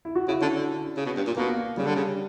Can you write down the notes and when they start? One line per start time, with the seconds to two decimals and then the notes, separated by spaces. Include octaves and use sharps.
0.05 E4
0.15 F#4
0.28 C#3 E4
0.41 D3 C#4
0.55 D3
0.96 C#3
1.06 B2
1.17 G2
1.27 A#2
1.37 B2 A#3
1.77 C#3 G3
1.86 D3
1.95 C#3